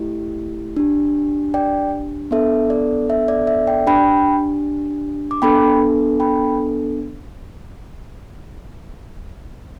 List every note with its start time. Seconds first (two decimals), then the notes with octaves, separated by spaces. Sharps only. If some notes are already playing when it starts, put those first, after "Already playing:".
Already playing: A3 E4 G4
0.76 D4 G4
1.54 D5 G5
2.31 B3 D4 A4 E5
2.70 D5
3.10 E5
3.28 D5
3.47 E5
3.67 D5 G5
3.87 D4 G4 G5 B5
5.31 D6
5.42 B3 D4 A4 G5 B5
6.20 G5 B5